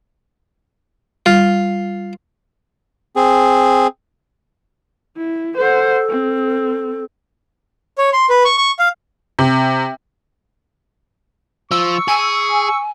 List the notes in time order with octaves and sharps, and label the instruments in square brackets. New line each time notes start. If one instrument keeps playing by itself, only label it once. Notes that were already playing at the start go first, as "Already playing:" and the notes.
[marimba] G3 [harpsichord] F4
[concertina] C4 G#4
[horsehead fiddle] E4
[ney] A4 [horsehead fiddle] C5 F#5
[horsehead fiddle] C4
[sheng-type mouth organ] C#5
C6
B4
C#6
C#6
F5
[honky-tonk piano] C3
[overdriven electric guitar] F3 [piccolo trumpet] C#6 [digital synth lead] E6
[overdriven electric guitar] G#4 [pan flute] G#5